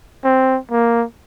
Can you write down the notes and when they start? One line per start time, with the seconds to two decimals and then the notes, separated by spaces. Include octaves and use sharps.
0.24 C4
0.71 A#3